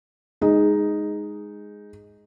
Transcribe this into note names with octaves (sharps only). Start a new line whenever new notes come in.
G#3 D#4